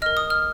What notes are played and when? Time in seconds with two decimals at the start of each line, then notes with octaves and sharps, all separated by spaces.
0.02 A#4 D#5 F6
0.17 D#6
0.30 F6